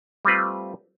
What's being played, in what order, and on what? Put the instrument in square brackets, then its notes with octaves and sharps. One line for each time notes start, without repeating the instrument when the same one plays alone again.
[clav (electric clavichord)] G3 A3 C4 F4 B4